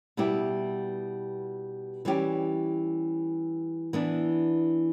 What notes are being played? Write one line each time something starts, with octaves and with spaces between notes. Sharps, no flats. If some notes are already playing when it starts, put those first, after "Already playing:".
B2 G3 B3 E4 G4
E3 G3 C#4 G4
E3 B3 D4